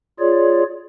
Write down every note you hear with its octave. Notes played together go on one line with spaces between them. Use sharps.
F4 G#4 C#5 D5